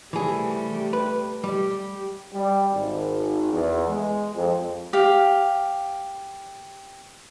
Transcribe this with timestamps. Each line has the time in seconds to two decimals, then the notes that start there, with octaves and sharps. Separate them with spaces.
0.13 C3 E3 G3 A3 G#4
0.93 B4
1.44 G3 G4
2.34 G3
2.73 G#1
3.53 E2
3.88 G#3
4.35 F2
4.93 G4 F5